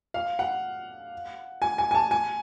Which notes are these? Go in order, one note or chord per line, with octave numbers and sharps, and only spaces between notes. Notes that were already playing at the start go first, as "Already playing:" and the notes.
F5
F#5
G#5
G#5
G#5
A5
G#5